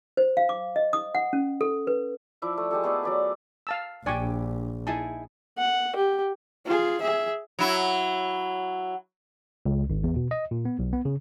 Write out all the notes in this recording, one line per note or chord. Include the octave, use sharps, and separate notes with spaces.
C5
F5
D6
D#5
D#6
F#5
C#4
A4
B4
F3 E4 D5 E5
A3
G#3 G4 A4
A3 B3 G#4 D5
F#3 D5 E5
F5 A5 E6
A#1 D4 G4 D5 G#5 C#6
D#4 E4 G#4 A5
F#5
G4
F4 G#4
G#4 E5
F#3 E4
C#2
G#1
E2
B2
D#5
A#2
B3
B1
B3
C#3